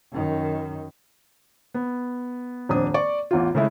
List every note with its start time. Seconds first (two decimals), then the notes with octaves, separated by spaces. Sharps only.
0.12 F#2 D#3
1.74 B3
2.69 D#1 F2 D4 D#6
2.94 D5 C#6 D6
3.31 A1 E2 F4
3.55 C#3 G#3 A3 E4